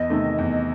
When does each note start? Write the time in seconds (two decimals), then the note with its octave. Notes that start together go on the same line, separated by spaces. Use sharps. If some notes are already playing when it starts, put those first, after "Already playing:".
Already playing: E2 D#5
0.10 C3 D#3 A3
0.38 E2